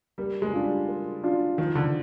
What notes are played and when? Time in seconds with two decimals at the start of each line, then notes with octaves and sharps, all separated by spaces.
0.18 G3 A#3
0.42 G#3
0.53 D4 F4
0.64 G3
0.88 A#3
1.23 D4 F4
1.58 D#3 F3
1.75 D3